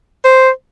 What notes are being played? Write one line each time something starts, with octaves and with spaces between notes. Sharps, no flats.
C5